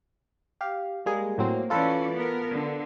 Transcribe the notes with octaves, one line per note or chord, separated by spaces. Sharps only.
G4 F5
G3 G#3 A#3 G#4
A2 F#3 A#3 C4
E3 C#4 F4 A4 B4 D5
B3 A#4
D3